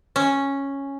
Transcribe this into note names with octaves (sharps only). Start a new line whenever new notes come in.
C#4